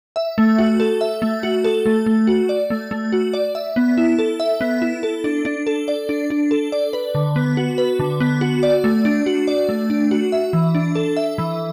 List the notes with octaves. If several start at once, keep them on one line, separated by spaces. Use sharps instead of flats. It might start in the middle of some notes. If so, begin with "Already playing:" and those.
E5
A3
F#4
A4
E5
A3
F#4
A4
A3
A3
F#4
D5
A3
A3
F#4
D5
E5
B3
E4
A4
E5
B3
E4
A4
D4
D4
A4
D5
D4
D4
A4
D5
B4
D3
B3
F#4
B4
D3
B3
F#4
D5
A3
D4
F#4
D5
A3
D4
F#4
E5
E3
D4
A4
E5
E3